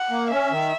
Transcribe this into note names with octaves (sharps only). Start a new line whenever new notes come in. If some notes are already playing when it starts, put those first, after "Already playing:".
Already playing: F#5
A#3
C#4 E5
D#3